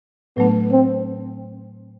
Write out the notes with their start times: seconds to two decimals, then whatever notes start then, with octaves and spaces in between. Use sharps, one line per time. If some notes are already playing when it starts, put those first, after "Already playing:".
0.37 A2 F#3 A3 B3 D4
0.72 C4